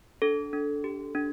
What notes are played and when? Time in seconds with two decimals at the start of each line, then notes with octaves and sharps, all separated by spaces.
0.22 D4 A4
0.53 D4
0.84 G4
1.15 D4